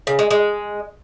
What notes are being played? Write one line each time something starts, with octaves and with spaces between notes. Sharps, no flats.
C#3
G#3
G#3